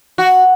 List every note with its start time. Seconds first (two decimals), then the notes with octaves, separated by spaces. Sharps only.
0.18 F#4